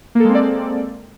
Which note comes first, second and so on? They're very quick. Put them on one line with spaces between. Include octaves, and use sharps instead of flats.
A#3 A4 G#3 C4 D5